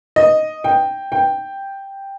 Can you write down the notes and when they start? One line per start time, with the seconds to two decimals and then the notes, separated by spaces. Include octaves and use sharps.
0.16 D#5
0.64 G5
1.12 G5